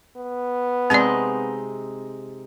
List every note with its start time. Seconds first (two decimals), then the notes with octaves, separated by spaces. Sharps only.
0.17 B3
0.90 C3 G#3 C4 D#4 D5